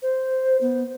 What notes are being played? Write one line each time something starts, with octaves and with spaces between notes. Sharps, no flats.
C5
B3